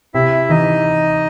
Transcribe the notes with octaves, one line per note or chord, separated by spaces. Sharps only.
C3 E4 E5
E3 D#4 D#5